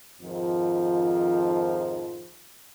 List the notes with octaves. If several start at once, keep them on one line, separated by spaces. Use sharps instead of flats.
F2 G#2 D#3 F3